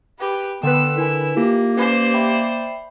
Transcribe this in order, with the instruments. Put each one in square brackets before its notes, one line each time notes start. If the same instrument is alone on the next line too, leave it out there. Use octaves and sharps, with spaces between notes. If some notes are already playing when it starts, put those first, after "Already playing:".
[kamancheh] G4 B4
[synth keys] D3 B4 [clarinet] B3 [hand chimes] G5 C6 [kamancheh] E6
[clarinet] E4 [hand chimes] A#4 G#5
[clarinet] A#3 [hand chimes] E4 F4 A#4 [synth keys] G4
[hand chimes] C#4 B4 [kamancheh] C5 D5
[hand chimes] E5 G5 B5